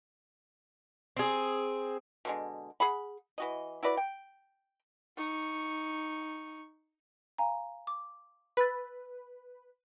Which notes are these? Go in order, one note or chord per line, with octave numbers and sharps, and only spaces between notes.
C4 G#4
B2 D3 G#3
G#4 F#5 B5
E3 F#4 D#5
E4 F#4 B4 D5
G5
D#4 C#6
F5 G#5 A#5
D6
B4 B5 E6 A6